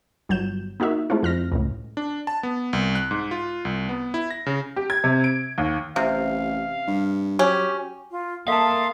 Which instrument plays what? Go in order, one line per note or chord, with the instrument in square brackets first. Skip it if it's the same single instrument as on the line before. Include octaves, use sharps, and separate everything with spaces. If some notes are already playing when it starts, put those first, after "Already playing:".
[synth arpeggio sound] G1 F#3 G6 E7
A#3 D#4 F#4 E5
G#3 A3 C4 E4 F4
F2 F6 A#6
C#2 A2
[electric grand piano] D4
A5
B3
C2
F#6
G#2
F4
C2
B3
E4
A#6
C#3
[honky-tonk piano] G4
G#6
C3
D7
D#2
[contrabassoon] A1 [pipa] C3 [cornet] F5
[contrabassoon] G2
[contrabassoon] F#3 [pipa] C#4 [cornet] G4
[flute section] F4
[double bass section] A#3 [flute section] A4 C6 D#6 [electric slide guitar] E5 A5 [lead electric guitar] F5